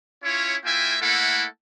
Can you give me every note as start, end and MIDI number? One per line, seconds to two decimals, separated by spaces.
0.23 0.56 61
0.23 0.56 64
0.23 0.56 65
0.23 0.56 73
0.64 0.96 58
0.64 0.96 64
0.64 0.96 65
0.64 0.96 76
0.64 0.96 79
0.64 0.96 80
1.00 1.45 57
1.00 1.45 58
1.00 1.45 64
1.00 1.45 69
1.00 1.45 78